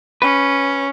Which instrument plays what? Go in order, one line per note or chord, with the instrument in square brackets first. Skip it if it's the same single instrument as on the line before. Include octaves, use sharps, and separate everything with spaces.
[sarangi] C#4 [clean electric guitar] B4